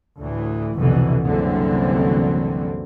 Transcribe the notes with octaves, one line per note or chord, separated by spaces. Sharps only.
D2 A2 E3
F1 C2 B2 D3 E3
F#1 C2 F#2 D3 E3 C4